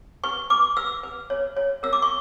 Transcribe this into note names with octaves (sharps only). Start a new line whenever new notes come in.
B4 C#6
B4 D6
B4 E6
B4
C#5
C#5
A#4 E6
D6
C#6